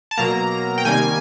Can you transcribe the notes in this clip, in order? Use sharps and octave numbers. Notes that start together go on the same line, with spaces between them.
A5
B2 F#3 A#3 A#5
G5
C3 D#3 G3 A#3 G#5